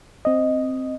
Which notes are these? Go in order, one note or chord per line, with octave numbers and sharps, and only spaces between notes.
C4 D#5